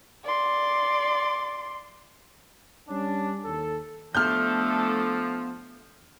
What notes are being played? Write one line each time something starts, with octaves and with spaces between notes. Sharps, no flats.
D5 C6
G3 C#4 D4
D#2 A4
F3 A3 B3 D4 A4 F6 G6